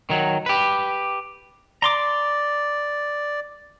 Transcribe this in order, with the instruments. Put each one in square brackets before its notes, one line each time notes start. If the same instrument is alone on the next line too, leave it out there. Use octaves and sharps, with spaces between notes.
[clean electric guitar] D#3 F#3
G4 B4
[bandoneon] D5 [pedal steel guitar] A#5 C6 D6